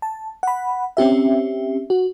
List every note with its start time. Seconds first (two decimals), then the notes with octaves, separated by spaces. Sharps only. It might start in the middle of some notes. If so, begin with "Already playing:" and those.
0.02 A5
0.43 F#5 B5
0.97 C4 C#4 G4 E5
1.90 F#4